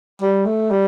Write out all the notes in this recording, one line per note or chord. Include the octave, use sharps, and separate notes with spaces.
G3
A3
G3